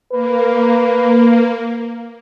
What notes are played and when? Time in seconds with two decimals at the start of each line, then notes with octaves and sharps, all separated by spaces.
0.11 A#3 B4